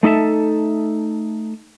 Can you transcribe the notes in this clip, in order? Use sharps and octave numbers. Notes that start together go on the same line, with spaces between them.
A3 D#4 A4 E5 A5